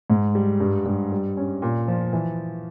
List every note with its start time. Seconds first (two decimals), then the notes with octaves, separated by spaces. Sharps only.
0.10 G#2
0.35 G3
0.60 G2
0.85 G2
1.12 G3
1.37 C#4
1.62 A#2
1.88 F3
2.13 E3